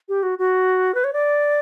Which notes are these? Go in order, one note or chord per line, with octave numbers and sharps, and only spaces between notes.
G4
F#4
F#4
B4
C#5
D5